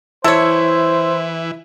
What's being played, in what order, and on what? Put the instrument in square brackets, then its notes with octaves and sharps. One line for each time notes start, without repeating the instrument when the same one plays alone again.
[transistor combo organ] E3 [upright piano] E4 [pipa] A4 C#5 [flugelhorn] C5